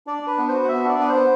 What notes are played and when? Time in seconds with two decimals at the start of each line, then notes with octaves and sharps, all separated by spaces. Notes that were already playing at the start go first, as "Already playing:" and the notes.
0.07 D4 D5
0.23 D4 B4
0.38 B3
0.49 F#4 C5
0.64 F#5
0.68 B3 E5
0.84 D4 D5
0.99 B3 B4
1.09 C5
1.15 B3